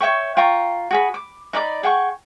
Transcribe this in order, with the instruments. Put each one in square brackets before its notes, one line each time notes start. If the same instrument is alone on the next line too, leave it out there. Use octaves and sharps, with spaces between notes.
[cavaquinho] C#5 E5 G5 C#6
F4 G5 A#5 C#6
F#4 G#4 B5
D6
D#4 D5 B5 D6
G#4 F#5 G5 C#6